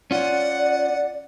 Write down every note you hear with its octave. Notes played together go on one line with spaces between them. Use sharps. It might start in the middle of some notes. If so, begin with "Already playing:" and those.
C#4 F4 D5 F#5